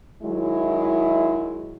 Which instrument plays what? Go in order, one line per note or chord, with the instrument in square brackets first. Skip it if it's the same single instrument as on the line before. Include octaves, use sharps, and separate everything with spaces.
[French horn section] D#3 F#3 G#3 E4